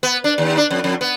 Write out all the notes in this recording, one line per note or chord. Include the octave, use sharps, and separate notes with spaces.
B3
D4
D#2
D4
F2
F2
B3